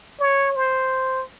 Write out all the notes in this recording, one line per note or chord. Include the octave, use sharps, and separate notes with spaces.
C#5
C5